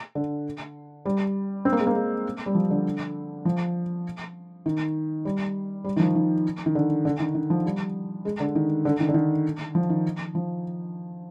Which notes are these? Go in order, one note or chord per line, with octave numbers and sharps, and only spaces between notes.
D3
G3
C4
A#3
G#3
A#3
G#3
G3
F3
D3
F3
D#3
G3
G3
D#3
F3
D#3
D#3
D3
D3
D#3
D#3
F3
G3
G#3
D3
D#3
D3
D#3
D3
D#3
F3
D#3
F3